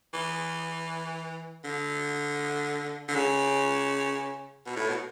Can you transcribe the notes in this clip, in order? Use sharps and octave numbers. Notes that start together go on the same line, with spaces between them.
E3
D3
D3
C#3
B2
A2
B2